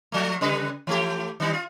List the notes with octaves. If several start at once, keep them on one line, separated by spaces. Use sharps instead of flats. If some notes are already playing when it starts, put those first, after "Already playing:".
F3 A3
C#3 G3 B4
E3 A3 G4
D#3 G3 D#4
F4